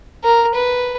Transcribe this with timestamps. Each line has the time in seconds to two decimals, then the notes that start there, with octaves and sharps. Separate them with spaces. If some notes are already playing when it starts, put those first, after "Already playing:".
0.24 A#4
0.54 B4